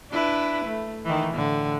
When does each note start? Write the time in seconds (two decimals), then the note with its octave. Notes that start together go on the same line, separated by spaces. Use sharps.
0.11 D4 E4 B4
0.65 A3
1.04 D#3 E3
1.34 A2 D3